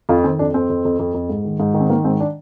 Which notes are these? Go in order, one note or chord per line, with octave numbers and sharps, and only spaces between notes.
F2 F4
D#3 C4
F2 D4
F2 C4
F2
F2
F2
F2
G#2
D#3
G#2
D#3
C4
D#3 A#3
G#2 C4
D4